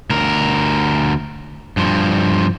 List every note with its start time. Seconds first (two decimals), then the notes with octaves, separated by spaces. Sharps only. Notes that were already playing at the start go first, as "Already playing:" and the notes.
0.10 D2 A#4
1.77 G2 F3